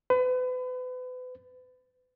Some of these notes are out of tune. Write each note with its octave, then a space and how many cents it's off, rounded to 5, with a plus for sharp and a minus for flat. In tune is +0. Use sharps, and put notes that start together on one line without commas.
B4 +35